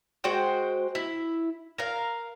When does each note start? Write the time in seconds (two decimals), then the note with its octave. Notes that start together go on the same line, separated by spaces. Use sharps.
0.24 G#3 F#4 C5 G5
0.95 E4
1.78 A#4 F5